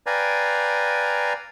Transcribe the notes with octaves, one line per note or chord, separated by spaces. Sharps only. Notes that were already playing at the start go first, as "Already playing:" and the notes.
B4 D5 F5 G5 G#5 A#5